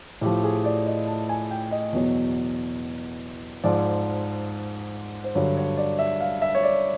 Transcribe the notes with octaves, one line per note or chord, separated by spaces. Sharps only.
A2 F3 G4
G#4
D5
D#5
A5
G#5
G5
D#5
E2 B2 F#3
G#2 F3 D5
C5
G2 D3 F#3 C#5
C#5
D5
E5
F5
E5
C#5
D5